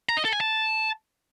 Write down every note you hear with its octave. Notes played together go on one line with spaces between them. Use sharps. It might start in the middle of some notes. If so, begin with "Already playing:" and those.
A#5
D#5
A4
G#5
A5